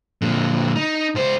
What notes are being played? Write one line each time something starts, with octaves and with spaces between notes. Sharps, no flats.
A#2 D3
D#4
C#2 C5